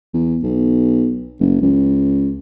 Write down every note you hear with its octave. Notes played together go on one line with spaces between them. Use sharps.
E2
B1
F#1
C#2